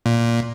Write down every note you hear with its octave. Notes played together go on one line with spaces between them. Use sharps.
A#2